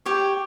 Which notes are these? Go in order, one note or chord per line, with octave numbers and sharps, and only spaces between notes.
G4 C#5 G5